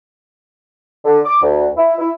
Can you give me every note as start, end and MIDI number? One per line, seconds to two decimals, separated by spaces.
1.05 1.19 50
1.24 1.38 86
1.41 1.67 38
1.76 1.93 64
1.98 2.09 64